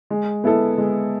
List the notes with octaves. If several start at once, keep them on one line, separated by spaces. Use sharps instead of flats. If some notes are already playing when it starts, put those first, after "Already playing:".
G#3
B3 E4 A4
G#3